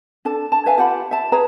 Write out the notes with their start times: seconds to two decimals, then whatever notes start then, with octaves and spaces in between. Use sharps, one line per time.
0.25 D4 A4 A5
0.52 A5
0.66 B4 E5 F5 G#5
0.78 F4 G4 F#5 B5
1.11 E5 A5
1.32 G#4 B4 C#5 A#5